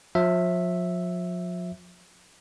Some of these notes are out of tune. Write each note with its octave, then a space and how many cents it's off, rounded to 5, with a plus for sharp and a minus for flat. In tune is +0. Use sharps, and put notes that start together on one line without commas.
F3 +40 E5 +0